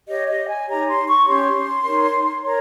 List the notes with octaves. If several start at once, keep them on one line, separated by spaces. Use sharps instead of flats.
G4 C#5 D#5
D#5
G#5
D#4 G4 C#5 A#5
C6
C#6
C#4 G4 C#5 C6
D#4 A#4 C#5
A#4 C#5 A#5